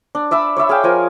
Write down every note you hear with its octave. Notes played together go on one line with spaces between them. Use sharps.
D4
D5 E5 B5 E6
C#5 D5 E5 B5
G#4 F5 G5
F3 A#4 G#5